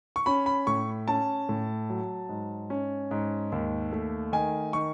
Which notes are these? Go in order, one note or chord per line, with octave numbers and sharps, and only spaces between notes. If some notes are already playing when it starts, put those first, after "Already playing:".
C#6
C#4 B5
B5
A2 C#6
C#4 A5
A2
F#3
G#2
C#4
G#2
D#2
A3
D#3 G#5
D#3 C#6